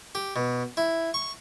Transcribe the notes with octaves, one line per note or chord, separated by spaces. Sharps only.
G4
B2
E4
C#6